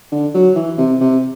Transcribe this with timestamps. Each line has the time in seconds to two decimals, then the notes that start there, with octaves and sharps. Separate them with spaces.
0.12 D3
0.34 F#3
0.55 E3
0.78 C3
1.00 C3